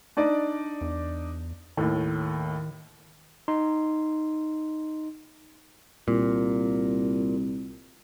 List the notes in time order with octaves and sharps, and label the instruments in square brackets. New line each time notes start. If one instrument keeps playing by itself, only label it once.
[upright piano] D4 D#4 D5
[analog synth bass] E2
[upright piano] D#2 A2 [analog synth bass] D#3
[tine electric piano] D#4 C6
[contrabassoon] C2 [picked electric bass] A#2